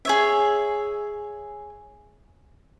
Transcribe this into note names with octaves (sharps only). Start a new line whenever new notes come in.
G#4 C#5 E5